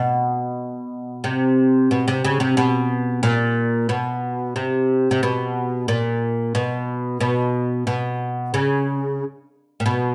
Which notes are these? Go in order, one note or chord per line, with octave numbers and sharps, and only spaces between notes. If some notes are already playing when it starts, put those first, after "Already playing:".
Already playing: B2
C3
B2
C3
C#3
C3
B2
A#2
B2
C3
C3
B2
A#2
B2
B2
B2
C#3
A#2
B2